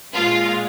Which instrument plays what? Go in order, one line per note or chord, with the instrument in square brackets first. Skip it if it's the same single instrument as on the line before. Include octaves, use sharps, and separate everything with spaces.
[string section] A#2 G#3 F4